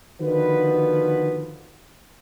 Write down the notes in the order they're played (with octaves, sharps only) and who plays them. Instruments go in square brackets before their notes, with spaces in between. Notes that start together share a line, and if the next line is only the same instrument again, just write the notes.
[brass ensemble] D3 D#3 F3 B3 F#4 B4